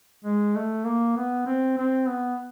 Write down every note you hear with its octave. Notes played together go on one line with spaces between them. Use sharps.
G#3
A3
A#3
B3
C4
C4
B3